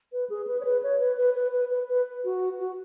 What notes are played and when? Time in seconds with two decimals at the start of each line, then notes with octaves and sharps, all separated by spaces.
0.12 B4
0.30 G#4
0.47 B4
0.61 C#5
0.65 B4
0.83 C#5
1.00 B4
1.17 B4
1.35 B4
1.53 B4
1.71 B4
1.89 B4
2.24 F#4
2.59 F#4